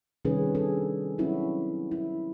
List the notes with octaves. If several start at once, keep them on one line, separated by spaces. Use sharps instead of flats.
C3 D#3 G3 C#4 G#4 B4
D4 G#4 A4
F#3 C4 C#4 E4 F#4
E4